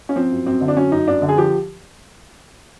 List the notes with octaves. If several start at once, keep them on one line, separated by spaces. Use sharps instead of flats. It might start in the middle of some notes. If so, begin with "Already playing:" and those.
C#4
F3 C4
F#2
F#2 C4
D3
D4
F#3 C#4
F#2 D#4
F#2 D4
D3
G#4
F3 G4